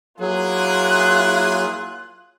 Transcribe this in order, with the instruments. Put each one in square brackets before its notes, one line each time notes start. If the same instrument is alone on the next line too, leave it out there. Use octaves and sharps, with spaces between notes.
[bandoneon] F#3 [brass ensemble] A#3 E4 G#4 [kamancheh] F4 F#6